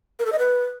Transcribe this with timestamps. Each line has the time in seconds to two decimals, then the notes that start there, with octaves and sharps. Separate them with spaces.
0.19 A#4
0.26 A4
0.32 D#5
0.39 B4